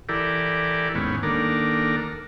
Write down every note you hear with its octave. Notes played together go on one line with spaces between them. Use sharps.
E3 E4 G4 A4 A#4 D5
D#2 G#2 B3 C#4
D#3 A#3 D4 A4 A#4